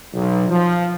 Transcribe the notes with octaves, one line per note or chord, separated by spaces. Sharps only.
B1
F3